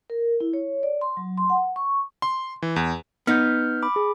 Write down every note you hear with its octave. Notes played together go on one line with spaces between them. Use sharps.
A#4
E4
C#5
D5
C6
F#3
C6
F#5
C#6
C6
E3
E2
B3 D#4 F6 G6
B5 D6
G#4